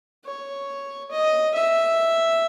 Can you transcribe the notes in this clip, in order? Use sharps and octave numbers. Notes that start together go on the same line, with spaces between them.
C#5
D#5
E5